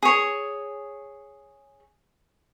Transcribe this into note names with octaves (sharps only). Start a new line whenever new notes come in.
G#4 C#5